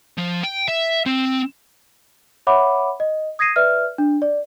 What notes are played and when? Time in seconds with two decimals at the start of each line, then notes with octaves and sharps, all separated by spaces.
0.17 F3
0.43 G5
0.68 E5
1.06 C4
2.47 C#5 E5 F#5 B5 D6
3.00 D#5
3.39 D#6 G#6 A#6 C7 D#7
3.56 B4 D5 E5 F6
3.98 D4
4.22 D5